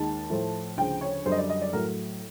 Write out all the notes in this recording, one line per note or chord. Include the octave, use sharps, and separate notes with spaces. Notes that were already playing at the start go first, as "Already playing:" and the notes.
Already playing: D#2 D#3 G#3 A5
A2 F3 A3
D2 C#3 F3 G5
C#5
F#2 D3 G3 C5
D#5
D5
D#5
D5
A2 F#3 A3 A#4